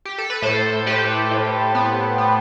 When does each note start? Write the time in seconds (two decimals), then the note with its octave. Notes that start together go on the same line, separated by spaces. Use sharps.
0.05 G4
0.18 A4
0.30 B4
0.42 A2 A4 C5
0.86 A2 G4 B4
1.31 A2
1.75 B3
2.18 B3